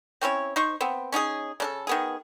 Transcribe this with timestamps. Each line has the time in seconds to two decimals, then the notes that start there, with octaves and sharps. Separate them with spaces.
0.21 C4 C#4 E4 C#5
0.56 D#4 C5 C#6
0.81 B3 C4
1.12 C#4 D#4 G4 G#4
1.60 C#3 D4 A4
1.87 D#3 B3 G#4